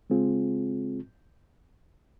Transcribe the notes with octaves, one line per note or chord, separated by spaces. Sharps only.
C#3 G#3 C4 F4 G#4